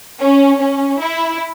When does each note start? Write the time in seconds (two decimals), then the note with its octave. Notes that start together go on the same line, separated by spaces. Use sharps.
0.19 C#4
0.59 C#4
1.00 E4